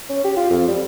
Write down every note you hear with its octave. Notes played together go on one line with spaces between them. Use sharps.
C#4
G4
F4
F2
G3